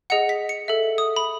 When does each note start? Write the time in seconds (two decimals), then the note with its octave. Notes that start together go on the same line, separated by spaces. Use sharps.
0.10 G#4 D#5 F#5 C#7
0.29 B6
0.49 C#7
0.68 A4 E5
0.98 D#6
1.16 B5